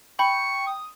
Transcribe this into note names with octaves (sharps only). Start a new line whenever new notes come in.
G5 B5 C#6
D#6